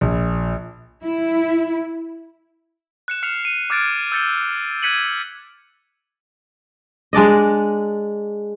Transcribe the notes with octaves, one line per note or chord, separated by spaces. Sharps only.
A#1
E4
F#6 C#7 E7
F6 C7 C#7 E7 F7
D#7
D6 F6 F#6 G#6 A6 D7
E6 G6 A6 C#7 G7
F#6 G#6 B6 C#7 D#7 F#7
G#3 D4 D5 D#5